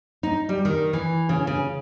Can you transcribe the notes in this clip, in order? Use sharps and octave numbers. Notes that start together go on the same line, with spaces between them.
D#4
G3
D#3
E3
C#3
C#3